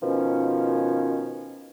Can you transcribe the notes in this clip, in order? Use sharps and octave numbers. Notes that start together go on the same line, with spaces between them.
B2 D#3 F3 C#4